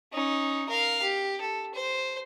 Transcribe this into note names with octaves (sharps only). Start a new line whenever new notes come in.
C#4 D#4
A#4 F5
G4
A4
C5